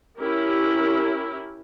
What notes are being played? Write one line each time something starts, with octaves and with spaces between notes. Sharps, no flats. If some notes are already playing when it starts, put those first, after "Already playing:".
C#4 E4 G4 A#4